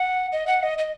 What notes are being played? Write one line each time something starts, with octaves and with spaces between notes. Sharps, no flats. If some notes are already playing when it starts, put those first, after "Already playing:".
Already playing: F#5
D#5
F#5
D#5
D#5